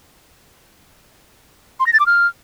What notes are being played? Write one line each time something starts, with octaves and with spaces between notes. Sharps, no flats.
C6
A#6
A6
D6
F6